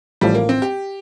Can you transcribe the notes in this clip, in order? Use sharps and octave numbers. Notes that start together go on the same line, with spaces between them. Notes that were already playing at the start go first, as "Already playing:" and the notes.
A1 A2 F3 G3
A#3
C4
G4